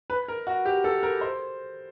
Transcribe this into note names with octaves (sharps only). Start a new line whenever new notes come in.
B4
A#4
F#4
G4
A4
A#4
C5